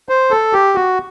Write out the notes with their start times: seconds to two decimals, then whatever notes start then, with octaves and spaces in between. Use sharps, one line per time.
0.09 C5
0.31 A4
0.53 G4
0.75 F#4